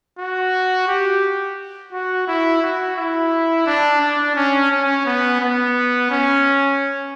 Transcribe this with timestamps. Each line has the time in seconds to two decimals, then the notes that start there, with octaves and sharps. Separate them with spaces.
0.19 F#4
0.88 G4
1.93 F#4
2.28 E4
2.63 F#4
2.97 E4
3.66 D4
4.01 D4
4.36 C#4
4.71 C#4
5.06 B3
5.41 B3
6.10 C#4